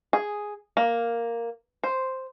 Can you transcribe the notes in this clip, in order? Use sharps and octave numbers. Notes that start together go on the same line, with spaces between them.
G#4
A#3
C5